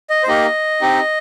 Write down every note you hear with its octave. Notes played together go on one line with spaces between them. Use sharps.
D#5
C5
A#3 D#4 G4 D#5
C4 D#4 G4